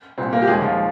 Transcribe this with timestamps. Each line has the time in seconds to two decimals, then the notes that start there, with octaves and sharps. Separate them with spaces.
0.18 C2 A#2 C4
0.33 A#3
0.42 G4
0.47 D#2 D#3 G#3 G#4
0.62 F3 F4